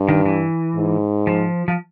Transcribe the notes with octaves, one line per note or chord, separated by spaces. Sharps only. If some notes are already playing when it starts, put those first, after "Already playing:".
Already playing: G2
D#3
E3
G#2
F3
F3